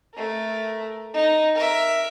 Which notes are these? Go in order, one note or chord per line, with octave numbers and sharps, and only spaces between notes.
A3 A#4
D#4
A#4 E5